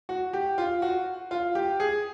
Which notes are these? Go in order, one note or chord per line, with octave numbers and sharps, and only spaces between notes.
F#4
G4
F4
F#4
F4
G4
G#4